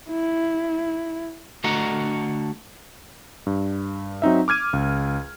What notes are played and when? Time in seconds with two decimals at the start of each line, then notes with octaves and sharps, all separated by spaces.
0.10 E4
1.64 D3 A3 F#4 D#5 F#5 A#5
3.46 G2
4.22 F#3 C4 D#4 E5
4.48 D6 F6 G#6 D#7
4.73 C#2